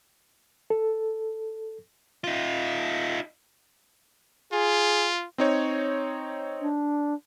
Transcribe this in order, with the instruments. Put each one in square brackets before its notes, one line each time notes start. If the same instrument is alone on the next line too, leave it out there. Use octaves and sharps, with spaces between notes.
[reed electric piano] A4
[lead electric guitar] D#4 F4
[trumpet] F4 [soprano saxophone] G#4
[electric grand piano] C4 D#4 C#5
[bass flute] D4